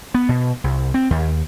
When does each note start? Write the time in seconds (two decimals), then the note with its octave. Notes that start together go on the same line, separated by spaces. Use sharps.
0.14 B3
0.29 B2
0.64 C2
0.94 C4
1.10 D#2